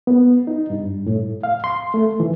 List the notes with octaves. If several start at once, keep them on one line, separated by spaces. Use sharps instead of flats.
B3
D#4
G2
A2
F5
C6
A3
E3